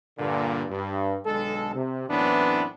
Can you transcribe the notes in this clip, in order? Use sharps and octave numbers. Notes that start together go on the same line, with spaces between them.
G2 A#2 D3
G2
B1 D3 G#3 A4
C3
F#2 A2 E3 B3 C4 D4